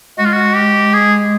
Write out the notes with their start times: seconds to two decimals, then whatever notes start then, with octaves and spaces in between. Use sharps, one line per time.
0.18 G#3 F#4
0.25 F4
0.33 F#4
0.56 G4
0.94 G#4